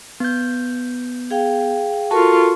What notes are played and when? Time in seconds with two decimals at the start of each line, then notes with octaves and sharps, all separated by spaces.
0.20 B3 G6
1.31 G#4 F5 G5
2.11 F4 F#4 A4 A#4 A5 C#6